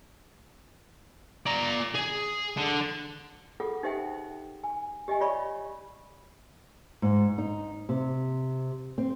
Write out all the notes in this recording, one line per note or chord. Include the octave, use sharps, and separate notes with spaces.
D5 A#5
G#4
D3
F4 G#4 A4 F#5 D#6
D#4 G4 C5 E5 F#5 G5
G#5
G4 D#5 E5 G#5
F4 C#5 D5 E5 B5 C#6
G#2
D#4
C3
C4